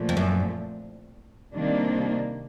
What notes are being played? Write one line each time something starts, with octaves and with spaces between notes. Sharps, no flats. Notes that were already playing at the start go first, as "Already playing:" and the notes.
Already playing: A#2 F3 A3
F2
F#2
C3 D#3 G3 A#3 D4